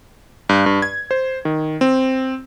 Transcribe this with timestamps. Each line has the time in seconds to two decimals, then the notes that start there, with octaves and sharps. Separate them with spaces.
0.49 G2
0.66 G2
0.82 G#6
1.11 C5
1.45 D#3
1.81 C4